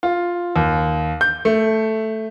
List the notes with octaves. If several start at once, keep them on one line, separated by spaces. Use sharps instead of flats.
F4
D#2
G6
A3